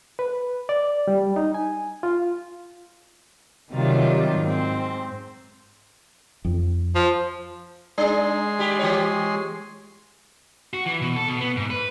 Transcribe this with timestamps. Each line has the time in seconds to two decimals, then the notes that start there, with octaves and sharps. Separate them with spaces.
0.19 B4
0.69 D5
1.08 G3
1.36 D#4
1.54 G#5
2.03 F4
3.72 C3 D#3 F#3 G3 F4
4.40 G#2 C4
6.45 F2
6.95 F3
7.98 G#3 D4 G#4 C6
8.59 G3 G4
8.79 E3 G4 C#5
10.73 F#4
10.86 E3
11.01 B2
11.16 A4
11.28 B2
11.41 B3
11.56 G#2
11.70 B4